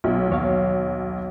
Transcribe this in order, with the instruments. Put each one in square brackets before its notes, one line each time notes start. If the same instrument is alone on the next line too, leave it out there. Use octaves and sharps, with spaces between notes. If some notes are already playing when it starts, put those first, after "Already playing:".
[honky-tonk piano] B1
[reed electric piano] D#2 C#5 F5